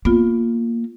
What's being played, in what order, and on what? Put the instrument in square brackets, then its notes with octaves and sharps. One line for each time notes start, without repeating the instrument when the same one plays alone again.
[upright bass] A#3 [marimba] B3 F4